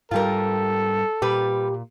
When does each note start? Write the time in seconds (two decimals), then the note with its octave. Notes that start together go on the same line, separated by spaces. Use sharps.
0.11 G#2 G3 F4 G4 A4 A#4
1.22 A#2 G3 G4 B4